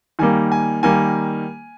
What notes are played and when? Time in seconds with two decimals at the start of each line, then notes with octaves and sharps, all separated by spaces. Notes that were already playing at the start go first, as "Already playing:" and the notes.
0.19 D#3 G3 A#3 G#5
0.52 G#5
0.83 D#3 G3 A#3 G#5